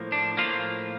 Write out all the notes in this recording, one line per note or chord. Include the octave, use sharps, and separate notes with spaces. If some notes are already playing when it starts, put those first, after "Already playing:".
Already playing: A2 F3 A#3
D4
A2 F3 A#3 F4